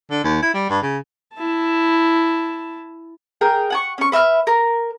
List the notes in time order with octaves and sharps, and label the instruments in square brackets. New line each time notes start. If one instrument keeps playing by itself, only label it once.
[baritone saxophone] D3
D#2
E4
G3
G2
C#3
[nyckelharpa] E4 A5
[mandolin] G#4 A#4 G5
F#5 G#5 C#6
C#4 C#6
B4 E5 A#5 F6
A#4